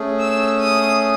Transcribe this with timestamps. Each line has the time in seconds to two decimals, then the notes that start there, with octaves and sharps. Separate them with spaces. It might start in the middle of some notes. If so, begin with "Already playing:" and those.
Already playing: A3 C#4 G#4
0.20 E6
0.60 D#6